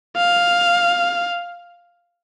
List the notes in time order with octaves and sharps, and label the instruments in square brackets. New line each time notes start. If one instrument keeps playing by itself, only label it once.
[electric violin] F5